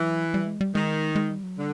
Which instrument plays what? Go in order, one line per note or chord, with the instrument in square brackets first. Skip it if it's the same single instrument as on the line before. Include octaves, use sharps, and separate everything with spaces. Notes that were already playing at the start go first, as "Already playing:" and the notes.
Already playing: [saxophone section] E3 [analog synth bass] F#3
[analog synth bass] G3
G#3
G3
[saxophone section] D#3 [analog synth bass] G#3
[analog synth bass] G#3
G3
F#3
[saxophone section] D3 [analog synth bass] G3